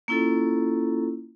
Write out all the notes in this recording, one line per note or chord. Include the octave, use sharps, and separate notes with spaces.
A#3 C#4 E4 F4 A4